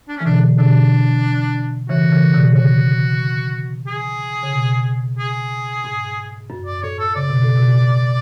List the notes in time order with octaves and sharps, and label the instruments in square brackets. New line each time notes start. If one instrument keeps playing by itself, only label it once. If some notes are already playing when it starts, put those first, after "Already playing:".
[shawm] D4
C#4
[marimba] E3
[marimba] B2 D3 [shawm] D4
[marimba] B2 D3 [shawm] D4
[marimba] C#3 E3 [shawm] F#4
[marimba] C#3 E3
B2 D3
[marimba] C#3 [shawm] F#4
[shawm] G#4
[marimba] C#3
B2
[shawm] G#4
[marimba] G#2
F#2
[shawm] D5
[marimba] A2 [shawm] C#5
[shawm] A4
[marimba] C#3 [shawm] D5
[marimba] B2
A2
B2